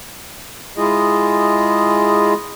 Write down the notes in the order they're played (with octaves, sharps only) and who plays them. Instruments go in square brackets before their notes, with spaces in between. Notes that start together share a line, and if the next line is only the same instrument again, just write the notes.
[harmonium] G#3 E4 F4 G#4 D#5